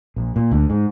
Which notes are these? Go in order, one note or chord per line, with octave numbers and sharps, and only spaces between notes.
A#1
A#2
D2
G#2